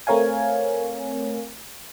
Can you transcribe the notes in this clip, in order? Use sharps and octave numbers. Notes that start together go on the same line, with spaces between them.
A3 C4 A#4 C#5 F5 G#5